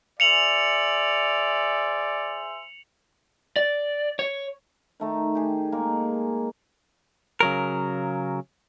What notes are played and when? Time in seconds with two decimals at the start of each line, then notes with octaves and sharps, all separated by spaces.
0.20 G#4 C5 D5 E5 C#7 F7 F#7
3.56 D5
4.19 C#5
5.00 D#3 A3 D#4
5.35 G4 G#4
5.72 G#3 A#3
7.41 C#3 F#3 A#4